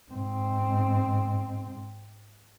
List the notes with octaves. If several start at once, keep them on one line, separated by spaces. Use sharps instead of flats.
G#2 C4